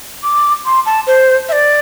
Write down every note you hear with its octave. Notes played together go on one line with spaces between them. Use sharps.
D6
C6
A5
C5
E5
D5